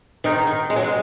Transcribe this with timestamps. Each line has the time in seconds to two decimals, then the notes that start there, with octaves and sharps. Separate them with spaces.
0.24 G#2 D#3 D#4
0.47 D#3
0.70 G#2 G#3
0.76 F#3
0.84 G#3